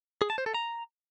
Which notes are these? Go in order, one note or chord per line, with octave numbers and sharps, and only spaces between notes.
G#4
A5
C5
A4
A#5